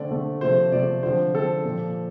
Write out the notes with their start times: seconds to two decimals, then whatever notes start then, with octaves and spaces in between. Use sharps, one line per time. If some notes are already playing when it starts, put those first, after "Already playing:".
Already playing: D3 A3 C4 D5
0.11 D3 A3 C4
0.41 C3 F3 A3 C5
0.72 C3 F3 A3 D5
1.03 D3 F3 C4 C5
1.34 D3 F3 C4 A4
1.65 A#2 F3 C4